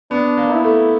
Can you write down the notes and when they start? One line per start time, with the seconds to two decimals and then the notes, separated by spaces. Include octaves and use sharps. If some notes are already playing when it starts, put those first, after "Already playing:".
0.11 B3 D4
0.37 A#3
0.50 E4
0.64 A3